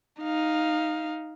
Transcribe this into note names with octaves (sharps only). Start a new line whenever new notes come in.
D#4 F5